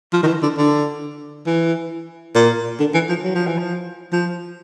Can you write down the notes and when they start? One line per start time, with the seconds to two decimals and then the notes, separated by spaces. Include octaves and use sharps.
0.13 F3
0.23 D#3
0.27 E3
0.42 D3
0.58 D3
1.46 E3
2.35 A#2
2.79 D3
2.94 E3
3.09 F3
3.23 F#3
3.35 F3
3.47 E3
3.58 F3
4.13 F3